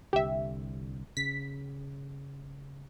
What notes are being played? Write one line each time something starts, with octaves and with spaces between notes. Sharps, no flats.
C2 D3 G4 E5
C#3 B6